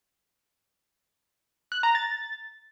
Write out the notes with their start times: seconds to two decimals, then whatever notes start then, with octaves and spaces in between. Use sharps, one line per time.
1.72 F#6
1.83 A#5
1.95 A6